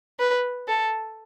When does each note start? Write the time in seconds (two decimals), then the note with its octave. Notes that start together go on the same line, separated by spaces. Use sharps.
0.19 B4
0.68 A4